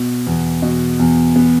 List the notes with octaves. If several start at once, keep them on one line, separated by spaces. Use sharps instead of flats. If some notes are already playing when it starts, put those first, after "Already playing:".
Already playing: B2
E2
B2
E2
B3